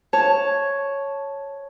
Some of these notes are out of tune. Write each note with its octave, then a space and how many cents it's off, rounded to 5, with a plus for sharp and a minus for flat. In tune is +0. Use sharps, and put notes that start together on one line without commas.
C#5 +0 A5 -5